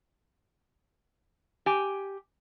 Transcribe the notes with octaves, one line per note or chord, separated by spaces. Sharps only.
G4 G#5